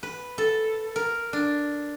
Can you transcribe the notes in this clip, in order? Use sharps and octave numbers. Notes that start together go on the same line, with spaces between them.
B4
A4
A#4
D4